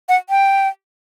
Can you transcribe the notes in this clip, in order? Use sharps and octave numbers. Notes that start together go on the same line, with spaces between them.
F#5
G5